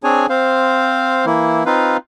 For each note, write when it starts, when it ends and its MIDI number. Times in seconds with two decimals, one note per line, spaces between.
0.04 0.26 60
0.04 0.26 62
0.04 0.26 68
0.04 0.26 73
0.04 0.26 80
0.29 1.26 60
0.29 1.26 72
0.29 1.26 77
1.26 1.63 52
1.26 1.63 58
1.26 1.63 64
1.66 1.97 60
1.66 1.97 63
1.66 1.97 65
1.66 1.97 71
1.66 1.97 77